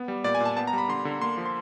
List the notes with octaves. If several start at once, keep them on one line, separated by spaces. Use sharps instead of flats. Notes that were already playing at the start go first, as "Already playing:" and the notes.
Already playing: B3
G3
A#2 D5
G#5
A#2 A5
B3 A5
A#5
G3 B5
D3 C6
D3
A#3 C6
F3
C6